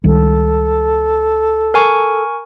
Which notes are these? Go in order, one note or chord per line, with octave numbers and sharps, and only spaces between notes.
C#2 D#3 G3 A4
A#4 G#5 C#6